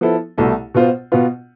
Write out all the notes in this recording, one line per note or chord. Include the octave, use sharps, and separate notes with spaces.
F3 B3 E4 A4
C2 B2 A3 E4 A4
B2 B3 F4 C5
B2 B3 F4